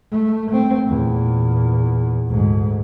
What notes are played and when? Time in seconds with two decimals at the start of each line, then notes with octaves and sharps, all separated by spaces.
0.12 A3
0.50 A3 C4
0.86 E2 A#2
2.28 D2 G#2